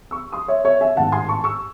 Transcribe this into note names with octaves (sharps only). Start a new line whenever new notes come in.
C#6 E6
C6 D#6
C#5 E5
C#5 E5
E5 G#5
A1 G#2 D#3 F#5 A5
G#5 C6
A5 C#6
C#6 E6